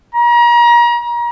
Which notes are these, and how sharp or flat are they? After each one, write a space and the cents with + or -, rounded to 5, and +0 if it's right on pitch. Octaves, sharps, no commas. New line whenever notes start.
A#5 +35